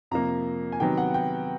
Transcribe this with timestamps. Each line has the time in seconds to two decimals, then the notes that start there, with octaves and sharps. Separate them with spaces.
0.11 F2 C3 F3 A#3 A#5
0.72 G#5
0.80 C3 D#3 F#3 B3 G5
0.97 F#5
1.14 G5